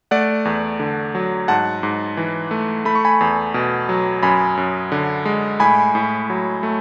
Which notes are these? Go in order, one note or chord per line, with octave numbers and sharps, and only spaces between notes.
A3 D5 F#5
E2
D3
F#3
G#2 F#5 A5
G#2
E3
A3
A3 B5
C#6
G#5 B5
E2
B2
F#3
F#2 G#5 B5
F#2
D3
G#3
A2 G#5 B5
A2
F#3
A3